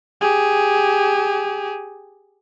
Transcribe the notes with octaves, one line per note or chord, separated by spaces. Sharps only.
G4 G#4